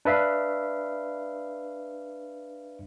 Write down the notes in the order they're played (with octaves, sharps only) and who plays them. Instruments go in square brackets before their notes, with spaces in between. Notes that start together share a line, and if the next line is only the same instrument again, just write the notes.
[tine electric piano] D4 B4 E5 F5